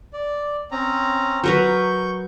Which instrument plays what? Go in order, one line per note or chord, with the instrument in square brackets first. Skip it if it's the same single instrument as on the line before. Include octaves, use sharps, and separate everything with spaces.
[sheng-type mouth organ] D5
C4 C#4 A#5
[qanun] F#3 A#4 B4 [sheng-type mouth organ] C#6 G6